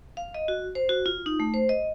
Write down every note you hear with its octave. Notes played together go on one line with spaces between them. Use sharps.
F5
D#5
F#4
C5
F#4
F4
D#4
A3
C5
D#5